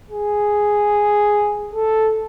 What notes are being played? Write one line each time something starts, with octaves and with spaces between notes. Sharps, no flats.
G#4
A4